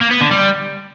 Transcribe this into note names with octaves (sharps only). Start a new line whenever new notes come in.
A#3
B3
D3
G3